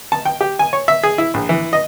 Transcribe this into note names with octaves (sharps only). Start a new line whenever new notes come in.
A5
G5
G4
G#5
C#5
E5
G#4
E4
A#1
E3
D#5